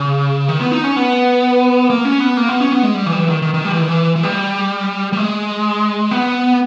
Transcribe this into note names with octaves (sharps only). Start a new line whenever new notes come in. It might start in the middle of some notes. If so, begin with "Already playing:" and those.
Already playing: C#3
D#3
B3
D#4
C#4
B3
A#3
C#4
B3
A#3
B3
C#4
B3
G#3
G3
E3
G3
E3
D#3
D#3
D#3
G3
E3
D#3
E3
E3
G3
G3
G#3
B3